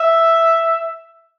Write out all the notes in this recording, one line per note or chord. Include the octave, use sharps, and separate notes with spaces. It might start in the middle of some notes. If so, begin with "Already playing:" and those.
Already playing: E5